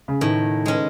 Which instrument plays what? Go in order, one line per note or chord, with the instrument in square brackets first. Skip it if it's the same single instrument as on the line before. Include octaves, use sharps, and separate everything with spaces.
[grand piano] C#3
[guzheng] A2 [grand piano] D#3
[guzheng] G#3 C#4